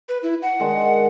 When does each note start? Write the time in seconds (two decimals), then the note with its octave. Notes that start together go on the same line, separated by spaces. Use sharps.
0.09 B4
0.23 E4
0.42 F#5
0.60 D#3 G#3 D4